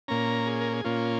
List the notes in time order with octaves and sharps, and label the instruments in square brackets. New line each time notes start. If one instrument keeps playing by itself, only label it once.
[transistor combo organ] A#2 A#3 C#4 A#5
G#4
A#4
G#4
A#2 A#3 C#4 F4